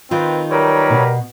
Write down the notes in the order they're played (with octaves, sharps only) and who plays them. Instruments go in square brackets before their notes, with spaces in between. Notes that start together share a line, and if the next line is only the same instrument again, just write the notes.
[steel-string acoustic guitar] D#3 D#4 F4 [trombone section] C4 B4
[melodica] F#3 C#5 [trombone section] G3 A#4 B4
[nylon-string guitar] B2